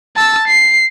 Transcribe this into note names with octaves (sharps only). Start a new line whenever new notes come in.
A5 E6
C7